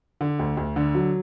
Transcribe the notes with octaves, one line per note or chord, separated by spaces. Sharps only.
D3
D2
D2
D3
F#3